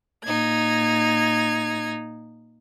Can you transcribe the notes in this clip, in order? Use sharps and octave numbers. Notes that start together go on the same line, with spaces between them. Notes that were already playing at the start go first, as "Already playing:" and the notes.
A#2 D#4 G#6